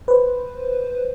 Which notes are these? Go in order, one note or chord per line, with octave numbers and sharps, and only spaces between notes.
B4 C5